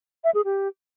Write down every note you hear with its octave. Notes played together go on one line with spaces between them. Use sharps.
E5
G#4
G4